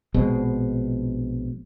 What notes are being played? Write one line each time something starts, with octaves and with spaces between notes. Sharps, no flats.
A#1 B2 G#3 C4